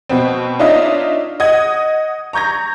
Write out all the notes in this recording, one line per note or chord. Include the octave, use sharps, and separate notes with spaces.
B2 B3 C4
D4 D#4 F4 C#5 D#5 E5
D#5 F#5 D#6 G#6
A#5 C#6 G6 G#6 A#6